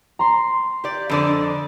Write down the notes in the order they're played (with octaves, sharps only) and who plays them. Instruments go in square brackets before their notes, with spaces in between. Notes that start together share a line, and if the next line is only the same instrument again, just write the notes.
[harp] A#5 C6
[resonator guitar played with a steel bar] G4 D5
F2 D3 D5